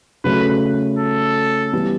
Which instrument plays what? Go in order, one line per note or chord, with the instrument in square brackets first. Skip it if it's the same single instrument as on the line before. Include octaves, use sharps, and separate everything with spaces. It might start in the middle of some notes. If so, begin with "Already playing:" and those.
[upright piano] C#3 F#3 A3 [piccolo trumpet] B4
[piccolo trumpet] A4
[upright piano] E3 G3 B3